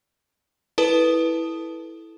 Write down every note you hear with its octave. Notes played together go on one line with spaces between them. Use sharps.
E4 A4 B4 A5 D#6